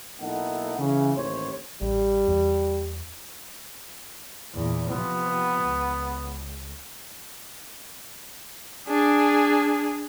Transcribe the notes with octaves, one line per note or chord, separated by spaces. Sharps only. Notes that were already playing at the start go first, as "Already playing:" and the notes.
B1 A#3 D#4 E4 A4 F#5
C#3 E3
A1 D#2 C5 C#5
A1 G3
E2
E2 A#2
C3 F3 B3
C#2
D4 G#4